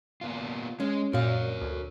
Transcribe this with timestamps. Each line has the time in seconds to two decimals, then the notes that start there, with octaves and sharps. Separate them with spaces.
0.21 A#3 B3 F4
0.80 G#3 C#4 G#4
1.13 F#2 A#2 F#4 A#4 C#5 F5
1.61 D2